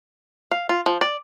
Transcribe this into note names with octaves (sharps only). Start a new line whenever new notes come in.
F5
F4
F3
D5